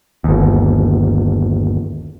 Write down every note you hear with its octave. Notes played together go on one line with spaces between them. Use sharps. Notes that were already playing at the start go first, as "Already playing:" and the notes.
G1 D#2